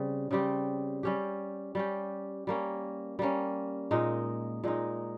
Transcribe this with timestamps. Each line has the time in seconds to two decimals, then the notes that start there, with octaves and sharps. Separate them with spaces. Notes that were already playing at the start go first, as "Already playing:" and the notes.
Already playing: C#3 G3 C4
0.31 C#3 G3 C4 G4
1.03 G3 C#4 G4
1.75 G3 C#4 G4
2.47 G3 A#3 C#4
3.19 G3 A#3 C#4
3.91 A#2 G#3 D#4
4.64 A#2 G#3 D#4